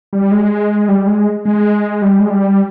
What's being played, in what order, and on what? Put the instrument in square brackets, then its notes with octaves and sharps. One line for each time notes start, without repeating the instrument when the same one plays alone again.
[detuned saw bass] G3
G#3
G3
G#3
G#3
G3
G#3
G3